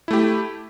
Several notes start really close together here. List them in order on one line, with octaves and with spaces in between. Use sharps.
E4 A3 G4